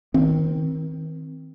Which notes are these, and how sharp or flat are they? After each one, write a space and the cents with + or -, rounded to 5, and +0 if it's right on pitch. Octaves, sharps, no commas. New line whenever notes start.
D#3 +35 C4 +0